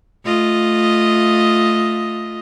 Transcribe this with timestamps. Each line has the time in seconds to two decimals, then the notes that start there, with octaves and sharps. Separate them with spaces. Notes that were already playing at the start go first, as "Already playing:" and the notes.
0.25 A3 F4 D#5